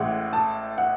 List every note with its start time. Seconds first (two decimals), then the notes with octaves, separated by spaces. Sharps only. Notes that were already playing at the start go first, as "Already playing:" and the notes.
Already playing: A1 A2 G#3 F#5
0.33 A5
0.78 F#5